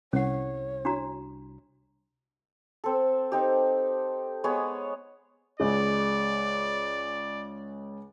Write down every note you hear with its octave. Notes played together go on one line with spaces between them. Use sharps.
C2 C#4 C#5 F#5
D4 F#4 A#5
C4 A4
C4 D#4 G4
G#3 B3 G#4 C#5
C#2 G#3 D5